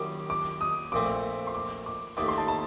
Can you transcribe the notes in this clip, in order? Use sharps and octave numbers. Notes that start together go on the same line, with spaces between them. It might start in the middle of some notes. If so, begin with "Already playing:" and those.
Already playing: F#2 D#3 G3 D6
D6
D#6
A#1 A#2 A3 C4 D6
C6
D6
D6
D#2 D#3 A3 D6
C6
A5
A5